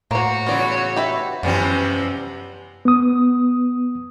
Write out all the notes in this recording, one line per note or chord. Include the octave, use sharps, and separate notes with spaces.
A2 A#3 F#4 C5 C#5
C#3 E3 B3 F4 D5
G4 B4 E5
F#2 C3 E3 F3 G3 B3 C#4 D4
B3 D#6